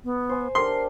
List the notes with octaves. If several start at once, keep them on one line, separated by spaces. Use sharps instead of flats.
B3
C5 G#5
D4 G4 A#4 C6